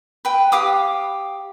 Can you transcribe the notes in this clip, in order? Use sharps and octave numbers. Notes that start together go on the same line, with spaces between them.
B4 G5
G4 F5 D6 D#6